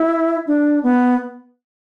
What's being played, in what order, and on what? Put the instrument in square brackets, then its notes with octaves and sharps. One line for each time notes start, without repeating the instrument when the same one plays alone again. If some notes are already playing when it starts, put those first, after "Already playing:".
Already playing: [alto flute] E4
D4
B3